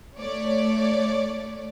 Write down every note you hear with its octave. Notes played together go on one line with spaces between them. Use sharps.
A3 C#5 D5